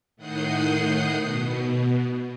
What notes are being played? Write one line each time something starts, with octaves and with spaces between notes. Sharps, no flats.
A2 D#3 F#5 D#6 G6 C7
B2